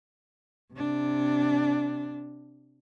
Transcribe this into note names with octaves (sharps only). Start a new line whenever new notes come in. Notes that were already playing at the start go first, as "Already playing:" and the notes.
C3 D4